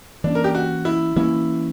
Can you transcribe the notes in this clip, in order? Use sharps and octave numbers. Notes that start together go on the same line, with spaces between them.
E3 A#3 C#4 D4
A#4
G4
F#4
E4
E3 A#3 C#4 E4